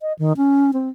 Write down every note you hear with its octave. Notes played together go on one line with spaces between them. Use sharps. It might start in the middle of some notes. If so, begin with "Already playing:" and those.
D#5
D#3
C#4
C4